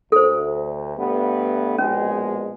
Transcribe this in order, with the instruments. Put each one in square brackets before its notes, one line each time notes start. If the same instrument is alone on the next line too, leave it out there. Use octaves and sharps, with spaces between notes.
[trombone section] D2 [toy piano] A4 C5
[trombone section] G2 A3 B3
[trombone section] A#1 B2 G#3 [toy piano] C#4